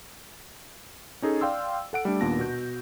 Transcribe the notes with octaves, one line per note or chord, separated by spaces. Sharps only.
C#4 D#4 G#4 A4
D5 F5 G5 C6 E6
A4 F#5 D7
G3 A3 D4
D#2 A#2 B3 D4 A5 A#6
B2 F#4 G6